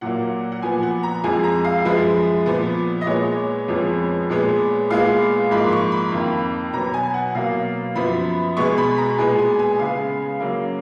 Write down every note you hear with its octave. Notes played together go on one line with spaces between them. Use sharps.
A#2 F#3 A#3 F#5
F#5
A#2 F3 B3 G#5
F#5
A#5
F2 F3 G#3 G#5
A#5
F5
F#2 F3 G#3 B4
A#2 F3 B3
D#5
A#2 G#3 B3 C#5
F2 F3 G#3 B3
A#2 G#3 B3
A#2 G#3 B3 F5
G#2 F3 A#3 B5
C#6
B5
F2 D#3 A#3
B2 F#3 B3 A#5
G#5
F#5
B2 F#3 A#3 F5
F#2 F3 B3 B5
B2 G#3 B3 C#6
B5
A#5
A#2 G#3 B3 G#5
G#5
G#5
C#3 G#3 B3 F5
C#3 F#3 A#3